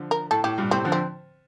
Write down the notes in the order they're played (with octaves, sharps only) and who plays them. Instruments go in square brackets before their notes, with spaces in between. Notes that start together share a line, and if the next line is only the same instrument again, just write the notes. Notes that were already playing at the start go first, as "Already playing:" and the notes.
Already playing: [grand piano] D3 F3
[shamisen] A#4
[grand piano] A2 [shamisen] A4
[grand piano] A2 [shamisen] G4
[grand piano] G2 A#2
[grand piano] A2 C3 [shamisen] C4
[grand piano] D3 F3
[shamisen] C4